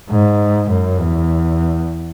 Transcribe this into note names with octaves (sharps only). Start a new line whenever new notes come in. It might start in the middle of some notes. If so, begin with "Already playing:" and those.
G#2
F#2
E2